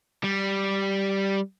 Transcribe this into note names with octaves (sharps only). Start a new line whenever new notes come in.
G3